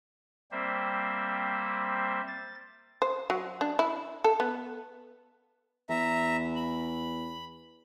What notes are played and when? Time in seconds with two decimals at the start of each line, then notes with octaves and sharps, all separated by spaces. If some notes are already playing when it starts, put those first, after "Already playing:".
0.51 G3 A#3 C4 C5 E5
2.28 A6
3.02 C5
3.30 F#3
3.61 D4
3.79 E4
4.24 A4
4.40 B3
5.89 E2 E5 A#5
6.56 B5